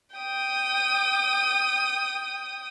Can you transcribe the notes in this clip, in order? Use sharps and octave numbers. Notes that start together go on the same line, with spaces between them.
G5 D#6